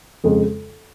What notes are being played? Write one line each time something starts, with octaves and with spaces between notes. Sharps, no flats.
F2 C#3 G#3